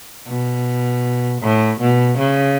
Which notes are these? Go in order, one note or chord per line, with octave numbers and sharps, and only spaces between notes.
B2
A2
B2
C#3